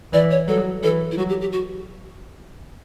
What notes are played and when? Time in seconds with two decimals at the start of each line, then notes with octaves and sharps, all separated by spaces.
0.13 E3 D5
0.31 C#5
0.48 F#3 A4
0.83 E3 A4
1.12 E4
1.18 F#3 F#4
1.29 G4
1.41 G4
1.53 F#4